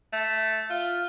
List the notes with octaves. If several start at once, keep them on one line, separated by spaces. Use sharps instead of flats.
A3
F4